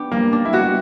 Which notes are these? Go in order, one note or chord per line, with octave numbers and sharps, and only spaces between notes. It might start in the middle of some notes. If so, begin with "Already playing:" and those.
Already playing: B3 D4 G4
G3 A#3
D4
E4
B3 F#4